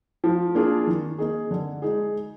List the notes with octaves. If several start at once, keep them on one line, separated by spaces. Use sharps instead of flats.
F3
A#3 D4 F4 G#4
D#3
A#3 D#4 G#4
D3
G#3 D#4 G#4